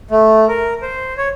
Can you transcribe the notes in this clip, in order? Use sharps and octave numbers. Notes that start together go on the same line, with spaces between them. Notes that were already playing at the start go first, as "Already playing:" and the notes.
A3
A#4
C5
C#5